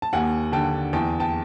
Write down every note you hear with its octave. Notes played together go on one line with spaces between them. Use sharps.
A5
D#2 F#5 G#5
D3 G5 A5
E2 G5 A5
G5 A5